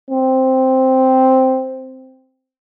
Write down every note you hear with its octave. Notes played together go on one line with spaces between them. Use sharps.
C4